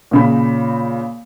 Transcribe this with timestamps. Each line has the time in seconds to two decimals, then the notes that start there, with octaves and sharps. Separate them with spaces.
0.11 A#2 C#3 B5